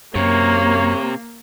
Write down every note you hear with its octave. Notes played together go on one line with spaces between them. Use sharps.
F#2 C3 A#3 C#5